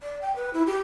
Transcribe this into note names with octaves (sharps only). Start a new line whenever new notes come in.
D5
G5
B4
E4
G4